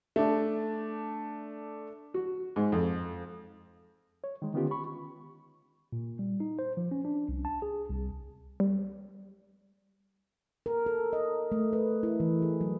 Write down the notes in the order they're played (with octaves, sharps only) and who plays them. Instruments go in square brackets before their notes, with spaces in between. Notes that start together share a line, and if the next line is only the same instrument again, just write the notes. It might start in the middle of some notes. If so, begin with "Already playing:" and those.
[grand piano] A3 D4
[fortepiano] F#4
G#2
F2
[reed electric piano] C#5
D#3 G#3
D3 D#3 B3 C#4 F4 G4
B5 C#6
[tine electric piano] A#2
G3
D#4
C5
F3
C#4
D4
C2
A5
G#4
C2
[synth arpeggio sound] G3
[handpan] A#4
A4
D#5
A3
B4
E4
E3
G#4
F#3